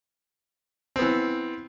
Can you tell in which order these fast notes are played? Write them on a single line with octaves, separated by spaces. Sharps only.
C4 B3 E3